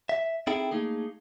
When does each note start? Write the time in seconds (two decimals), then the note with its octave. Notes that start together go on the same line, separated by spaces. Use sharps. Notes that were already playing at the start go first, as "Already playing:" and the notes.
0.09 E5
0.47 C4 D#4 E4 G#4 A4 G5
0.71 A3 A#3 D#4 G#4